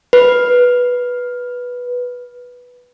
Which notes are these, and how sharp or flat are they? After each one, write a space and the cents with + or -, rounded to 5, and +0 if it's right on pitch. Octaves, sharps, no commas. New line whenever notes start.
B4 -10